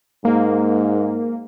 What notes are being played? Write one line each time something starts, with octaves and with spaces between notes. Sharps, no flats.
G#2 A#3